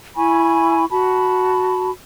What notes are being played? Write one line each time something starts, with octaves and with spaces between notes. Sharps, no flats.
E4 G#5 B5 C#6
F#4 A5 B5